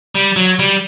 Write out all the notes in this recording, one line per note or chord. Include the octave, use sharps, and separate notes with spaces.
G3
F#3
G3